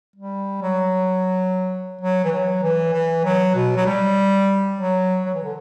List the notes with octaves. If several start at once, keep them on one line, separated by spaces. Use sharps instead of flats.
G3
F#3
F#3
E3
F#3
E3
E3
F#3
B2
F#3
G3
F#3
F#3
E3
D3